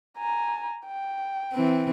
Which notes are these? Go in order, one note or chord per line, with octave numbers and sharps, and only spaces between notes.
G#5 A#5
G5
E3 C4